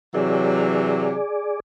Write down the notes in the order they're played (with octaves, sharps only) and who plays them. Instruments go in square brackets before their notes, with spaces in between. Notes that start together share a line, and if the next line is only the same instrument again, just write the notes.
[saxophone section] C3 E3 F#3 [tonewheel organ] G#4 D5